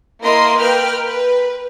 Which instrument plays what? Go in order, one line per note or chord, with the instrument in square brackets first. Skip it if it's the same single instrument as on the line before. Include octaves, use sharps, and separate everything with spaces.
[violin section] A#3 E4 A#4 D#5 C6
A#4 B4 G5 F6
B4